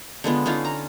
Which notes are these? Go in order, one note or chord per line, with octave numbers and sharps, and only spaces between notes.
D3 G#3 B3 F4
D3 C#4 D#4 F4
A#5